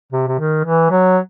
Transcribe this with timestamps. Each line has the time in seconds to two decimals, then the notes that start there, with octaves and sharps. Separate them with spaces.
0.12 C3
0.27 C3
0.39 D#3
0.65 E3
0.91 F#3